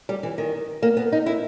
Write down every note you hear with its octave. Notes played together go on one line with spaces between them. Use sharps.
G3
E3
D#3
A#3
B3
D#4
E4